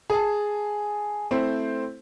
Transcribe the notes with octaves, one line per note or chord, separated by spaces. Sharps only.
G#4 A5
A3 C4 E4 C5